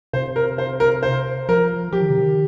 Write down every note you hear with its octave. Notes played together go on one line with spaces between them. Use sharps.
C3 C5
A#4
C5
A#4
C5
F3 A#4
F3 G4
D#3
C3
D#3